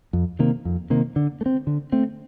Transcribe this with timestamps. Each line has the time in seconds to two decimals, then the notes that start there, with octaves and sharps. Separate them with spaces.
0.13 F2
0.39 C3 D#3 A#3
0.65 F2
0.90 C3 D#3 A#3
1.16 D3
1.41 A3
1.46 C4
1.67 D3
1.92 A3 C4